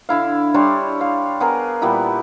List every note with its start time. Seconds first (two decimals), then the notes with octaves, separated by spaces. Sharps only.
0.09 D3 E4 F5
0.54 G3 D4 C#5 C6
1.01 F5
1.40 B3 G#4 A#4
1.82 A#2 G3 B3 E4